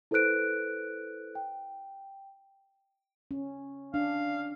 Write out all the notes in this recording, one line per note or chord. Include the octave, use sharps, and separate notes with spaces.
E4 A4 B4 C5 F#6 D7
G5
C#4
D4 F5